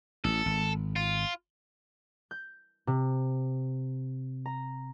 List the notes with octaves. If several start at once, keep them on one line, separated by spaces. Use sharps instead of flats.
A1 A4
G#1
F4
G6
C3
A#5